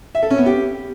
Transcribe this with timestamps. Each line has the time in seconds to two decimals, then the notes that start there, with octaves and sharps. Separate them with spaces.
0.15 E5
0.22 A4
0.30 C#4
0.38 B3
0.46 G4